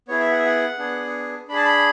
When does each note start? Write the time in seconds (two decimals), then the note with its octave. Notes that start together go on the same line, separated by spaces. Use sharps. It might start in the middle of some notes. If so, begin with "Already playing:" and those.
0.08 B3 E4 G#4 C#5
0.20 E5
0.31 F#5
0.39 E5
0.46 F#5
0.78 B3 D4 G#4
1.48 D4 B5
1.52 G#4 A5
1.65 B5